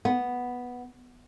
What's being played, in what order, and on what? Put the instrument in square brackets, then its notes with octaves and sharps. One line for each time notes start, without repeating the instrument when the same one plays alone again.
[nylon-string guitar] B3